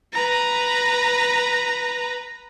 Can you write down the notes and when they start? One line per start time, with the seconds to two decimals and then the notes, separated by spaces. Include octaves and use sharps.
0.13 B4 A#5